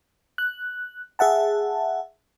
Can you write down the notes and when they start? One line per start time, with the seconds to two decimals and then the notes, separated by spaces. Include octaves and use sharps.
0.38 F#6
1.19 G#4 E5 F#5 A5